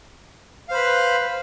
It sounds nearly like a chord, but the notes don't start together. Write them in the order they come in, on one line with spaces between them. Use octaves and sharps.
F5 C5 B5 B4